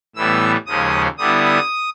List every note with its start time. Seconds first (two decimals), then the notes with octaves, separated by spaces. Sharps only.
0.15 A2 E3 G3 B3 E6
0.66 D#2 C#3 F3 G#3 C#4 D#6
1.18 D3 G3 B3 E4 D#6